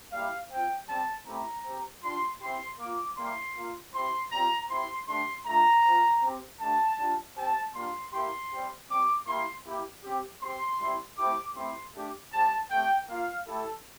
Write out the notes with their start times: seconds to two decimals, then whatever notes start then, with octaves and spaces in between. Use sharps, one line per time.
0.12 G3 A#3 E4 G4 F5
0.50 C4 F4 G5
0.88 G3 C4 G4 A5
1.26 A3 C4 E4 G4 A#5
1.65 C4 G4
2.03 G3 D4 F4 C6
2.41 C4 E4 G4 C6
2.79 A#3 F4 D6
3.17 G3 A#3 E4 G4 C6
3.56 A#3 F4
3.94 C4 E4 G4 C6
4.32 G3 C4 F4 A#5
4.69 C4 E4 G4 C6
5.08 A3 D4 G4 C6
5.46 A3 D4 F4 A#5
5.84 C4 F4
6.22 C4 G4
6.60 A3 D4 G4 A5
6.99 G3 D4 F4
7.37 C4 G4 A5
7.74 G3 A#3 D4 F4 C6
8.13 A#3 E4 G4 C6
8.52 G3 C4 G4
8.89 G3 C4 G4 D6
9.27 A#3 E4 G4 C6
9.65 A#3 E4 G4
10.04 C4 G4
10.42 C4 G4 C6
10.80 G3 C4 E4 G4
11.18 A3 C4 E4 G4 D6
11.56 A3 C4 E4 G4 C6
11.94 A3 D4 G4
12.32 G3 C4 G4 A5
12.70 A3 C4 G4 G5
13.09 A#3 F4 F5
13.47 A3 E4 G4 A4